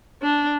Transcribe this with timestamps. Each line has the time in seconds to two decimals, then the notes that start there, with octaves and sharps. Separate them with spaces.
0.22 D4